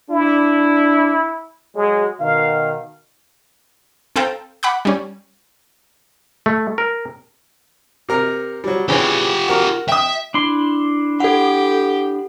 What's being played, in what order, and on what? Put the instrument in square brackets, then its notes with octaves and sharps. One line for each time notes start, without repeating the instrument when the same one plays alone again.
[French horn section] D4 [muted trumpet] E4
[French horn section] F#3 G#4 [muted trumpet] G#3
[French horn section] B2 D#3 [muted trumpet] F5
[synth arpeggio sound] C4 A4 F5 G5 A#5
F#5 B5 D6 F#6
G3 C#4
[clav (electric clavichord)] A3
A#4
[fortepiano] C3 A#4 A#5
F#3 G3
[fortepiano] C#3 E3 C#4 [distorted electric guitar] F4 G4
[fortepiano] F#4 A#4
[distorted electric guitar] E5 [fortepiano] G5 D#6
[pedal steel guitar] D4 E4 C6
[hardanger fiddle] G4 [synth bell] A4 F#5